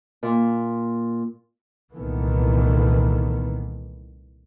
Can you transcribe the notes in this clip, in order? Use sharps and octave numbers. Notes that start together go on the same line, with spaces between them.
A#2
C2 A#2 D#3 E3 A3 B3